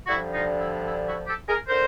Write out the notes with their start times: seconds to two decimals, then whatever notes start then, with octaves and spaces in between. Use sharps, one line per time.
0.06 G2 D3 F3 E4 F#4
0.33 D#4 F4
0.60 E4
0.88 E4
1.07 E4 F#4
1.27 G4 A4
1.48 G#4 A#4
1.68 D3 A#4 C5